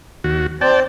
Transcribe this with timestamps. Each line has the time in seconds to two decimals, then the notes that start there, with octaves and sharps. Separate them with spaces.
0.24 D#2 F#4
0.61 C4 D5 G5 A5